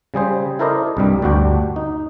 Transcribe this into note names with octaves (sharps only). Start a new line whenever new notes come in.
C#3 G3 G#4 C5
E4 A4 A#4 C5 D5 D#5
C2 G2 G3
D2 G2 D4 F#4 G5
D#4